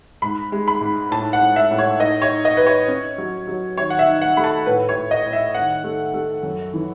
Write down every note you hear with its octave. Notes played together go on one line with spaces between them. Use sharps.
G#2 B5
G#3
B5
G#2
A2 A5
F#5
A2
E5
A2
C#5
D#4 D#5
C#5
D#4
D#5
D#4 B4
C#5
C#4
F#3
F#3
D#3 C#5
F#5
E5
D#4
F#5
A3 B5
A5
A2 B4
C#5
A2
D#5
A2
E5
D#3 F#5
A3
A3
F#2
E3